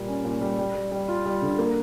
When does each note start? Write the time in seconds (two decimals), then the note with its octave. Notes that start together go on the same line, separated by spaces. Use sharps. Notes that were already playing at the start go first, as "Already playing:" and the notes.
Already playing: A#2 G3 A#3
0.08 C#4
0.25 A#2
0.41 G3
0.58 G3
0.75 G3
0.92 G3
1.08 F4
1.26 G3
1.42 D3
1.58 A#3